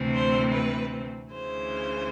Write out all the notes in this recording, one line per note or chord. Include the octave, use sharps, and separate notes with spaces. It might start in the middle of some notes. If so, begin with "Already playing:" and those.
Already playing: D2 C3 E3 A3 C4
C5
B4
D2 C#3 E3 C5